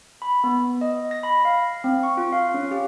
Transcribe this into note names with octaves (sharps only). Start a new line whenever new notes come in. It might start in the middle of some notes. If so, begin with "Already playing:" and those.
B5
B3
D#5
A#6
B5
F5
C4
C#6
F4
F5
C#4
G4